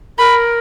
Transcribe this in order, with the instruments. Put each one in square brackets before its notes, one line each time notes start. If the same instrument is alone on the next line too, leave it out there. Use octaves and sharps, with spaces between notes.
[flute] A#4 [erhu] B5